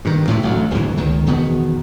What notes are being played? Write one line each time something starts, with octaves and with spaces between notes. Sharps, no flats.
G2 D#3
A2 C3 E3
A1 D2 F#3
D1 G1 D2 E3
C#2 D#3
E2 B2 D#3 B3